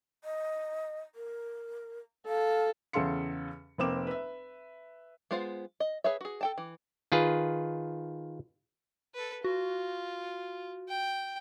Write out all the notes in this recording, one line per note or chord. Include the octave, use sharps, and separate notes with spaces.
D#5
A#4
A4 F5
E2 C#3 A4 F5 C6 C#7
F1 A#3 C4 D6 E7
B4 E5
G#3 B3 F4 C5 F5
D#5
G#4 B4 C#5 E5
F#4 G#4
A4 G5 A5
E3
D#3 F4 G#4 B4
A4 B4
F4 F#4
G5